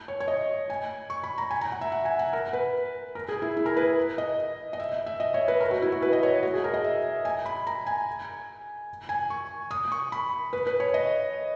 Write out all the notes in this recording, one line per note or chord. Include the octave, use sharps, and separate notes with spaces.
C#5
C#5
D#5
G#5
C#6
B5
A#5
G#5
A#5
F#5
E5
F#5
G#5
F#5
A#4
B4
A#4
G#4
E4
E4
A#4
B4
D#5
D#5
E5
E5
D#5
C#5
B4
A#4
F#4
E4
F#4
B4
D#5
C#5
F#4
G#4
A#4
D#5
E5
G#5
B5
A#5
G#5
G#5
C#6
D#6
C#6
B5
B4
B4
C#5
D#5